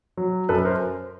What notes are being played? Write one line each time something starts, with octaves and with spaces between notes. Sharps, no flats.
F#3
F#2 A4 B4
A#4 C5